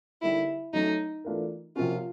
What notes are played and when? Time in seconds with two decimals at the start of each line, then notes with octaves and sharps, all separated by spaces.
0.22 D3 G3 A#3 D#4 E4 G4
0.73 F#3 A3 C#4 D#4
1.25 E3 A3 D4 F4 A#4
1.76 C3 F3 A#3 C#4 F4 F#4